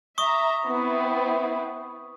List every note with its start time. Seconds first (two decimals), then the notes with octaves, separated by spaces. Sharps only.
0.18 E5 A#5 C#6 D#6
0.64 B3 C4 E4